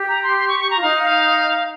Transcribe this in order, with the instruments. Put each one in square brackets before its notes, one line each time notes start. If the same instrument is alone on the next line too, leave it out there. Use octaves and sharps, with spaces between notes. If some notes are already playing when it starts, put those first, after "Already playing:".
Already playing: [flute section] G4
[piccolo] A#5
C6
C6
C#6
C#6
A#5
[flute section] F4
[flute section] D#4 [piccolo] F5
[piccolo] F5